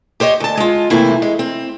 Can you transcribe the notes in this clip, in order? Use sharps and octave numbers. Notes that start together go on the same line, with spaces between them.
G4 C5 C#5 D#5
D2 A5
G#3 F4
C3 E3 A3 A#3 C4 E4
G#3
C4